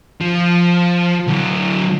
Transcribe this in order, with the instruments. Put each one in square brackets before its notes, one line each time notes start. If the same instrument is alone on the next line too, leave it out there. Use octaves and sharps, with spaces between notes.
[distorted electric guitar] F3
D2 F#3